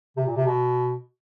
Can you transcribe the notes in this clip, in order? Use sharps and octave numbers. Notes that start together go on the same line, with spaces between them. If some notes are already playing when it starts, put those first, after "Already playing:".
C3
A#2
C3
B2